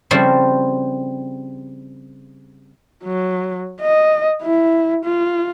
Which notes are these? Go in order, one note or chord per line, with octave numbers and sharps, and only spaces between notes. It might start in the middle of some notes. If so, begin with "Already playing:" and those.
C#3 F3 G3 C4 E4 A4
F#3
D#5
E4
F4